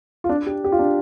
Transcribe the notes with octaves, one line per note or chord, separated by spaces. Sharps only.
F4
D4
G4
G4
F4
D4